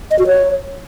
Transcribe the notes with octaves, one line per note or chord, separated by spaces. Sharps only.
D#5
F#4
C#5